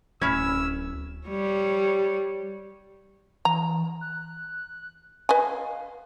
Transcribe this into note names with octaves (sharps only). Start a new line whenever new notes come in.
D1 C#4 E4 E6 F6 G#6
G3 C#5
E3 A#5
F#6
B4 D#5 F5 G#5